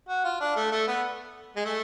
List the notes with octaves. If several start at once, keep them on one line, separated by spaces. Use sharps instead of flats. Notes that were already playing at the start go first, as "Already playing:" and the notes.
F#4
F4
D4
A3
A3
B3
G#3
A3